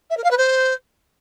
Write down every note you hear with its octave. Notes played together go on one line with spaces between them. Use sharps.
E5
A#4
F5
B4
C5